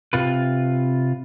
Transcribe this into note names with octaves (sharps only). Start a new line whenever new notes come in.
C3 F4 B4